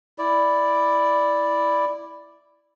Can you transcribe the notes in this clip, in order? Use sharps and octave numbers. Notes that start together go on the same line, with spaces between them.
E4 D5